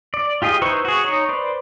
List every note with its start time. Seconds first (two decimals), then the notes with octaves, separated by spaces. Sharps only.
0.14 D5
0.42 F4 G4 G#4 D#5
0.62 D#4 E4 B4 C5 C#6
0.85 F#4 G#4
1.04 D#4 C#5
1.29 B4 C5 D5